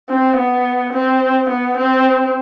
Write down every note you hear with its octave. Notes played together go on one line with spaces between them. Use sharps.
C4
B3
C4
B3
C4